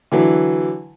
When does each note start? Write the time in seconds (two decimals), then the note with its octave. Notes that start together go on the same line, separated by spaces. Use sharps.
0.12 D3 E3 F#3